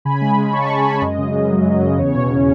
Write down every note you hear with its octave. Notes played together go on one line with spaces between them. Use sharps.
C#3 G#5 B5
G#3
C#3
B5
C#4 A5 C#6
C#3
G#5 B5
G#3
F#2 D#5
C#3
F#2
F#3
F#2
C#3
E2 C#5
B2
C#4